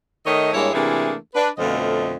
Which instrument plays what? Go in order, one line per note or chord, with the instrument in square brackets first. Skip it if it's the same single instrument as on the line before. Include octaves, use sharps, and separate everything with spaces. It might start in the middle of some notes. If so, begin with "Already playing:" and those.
[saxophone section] D#3 A3 C#5 D#5
G2 G#3 A#3 E4 C#5
C3 E3 A3 A#3 D4 G#4
D4 B4
F2 B2 D3 F3 A3 D#5